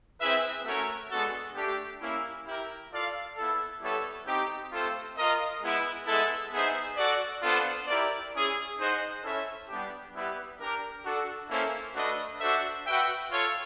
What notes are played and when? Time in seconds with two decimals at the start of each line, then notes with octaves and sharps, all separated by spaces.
0.19 C4 E4 G#4 B4 E5
0.65 A3 C#4 F#4 A#4 C#5
1.10 G#3 B3 D4 F#4 A4
1.56 A3 D4 G4
2.00 A#3 C#4 E4
2.46 E4 G4 A#4
2.91 F4 A4 D5 F5
3.36 B3 E4 A4
3.81 G3 B3 E4 A4 C#5
4.26 C4 D#4 G4
4.72 A3 C4 F4 A4 C5
5.17 F4 A#4 D#5
5.62 G#3 B3 E4
6.07 G#3 B3 E4 A4
6.52 B3 D#4 G#4 C5 E5
6.97 F#4 A4 D5
7.43 B3 D4 F4 A4 C5
7.87 E4 G4 A#4 D5
8.33 C#4 E4 G#4
8.78 D#4 G#4 C5 D#5 F#5
9.23 C#4 E4 A4 C#5 E5
9.68 G3 B3 D4 G4
10.14 G3 B3 E4 G4 B4
10.59 D4 G4 A#4
11.04 D4 F#4 A4
11.49 A#3 C#4 E4 A4 C5
11.94 A3 D4 F#4 B4 D#5
12.39 D4 F#4 A4 C5 E5
12.85 F#4 B4 E5 G5
13.30 F4 A4 C#5